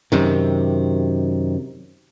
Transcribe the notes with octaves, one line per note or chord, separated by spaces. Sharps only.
F#2 C3 D#3